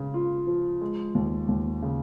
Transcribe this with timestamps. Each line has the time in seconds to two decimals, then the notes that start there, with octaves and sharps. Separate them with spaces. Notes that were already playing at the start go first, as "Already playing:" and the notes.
Already playing: C#3
0.14 F4
0.47 F3
0.81 G#3
1.15 D#2
1.48 D#2
1.82 C#3